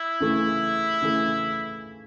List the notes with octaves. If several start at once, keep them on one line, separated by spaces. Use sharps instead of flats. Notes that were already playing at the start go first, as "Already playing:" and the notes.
Already playing: E4
C#3 E3 A3
C#3 E3 A3